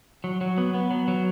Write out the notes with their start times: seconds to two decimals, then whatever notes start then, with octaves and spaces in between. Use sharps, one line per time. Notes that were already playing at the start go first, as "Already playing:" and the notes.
0.24 F#3
0.41 F#3
0.58 B3
0.74 B3
0.91 F#3
1.08 F#3